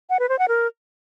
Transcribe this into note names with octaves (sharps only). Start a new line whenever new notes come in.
F#5
B4
C5
F#5
A#4